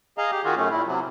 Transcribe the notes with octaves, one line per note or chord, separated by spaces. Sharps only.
G#4 D#5 F5 A#5
G4
D#3 F4 F#4 G#4
F#2 A3 C#4
A#2 E4
C3 F#3